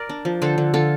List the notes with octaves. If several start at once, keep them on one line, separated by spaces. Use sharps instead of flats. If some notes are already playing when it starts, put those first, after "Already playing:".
Already playing: A#4 D5
D4
F3
D3 A4 C5
D3
D3 F4 A4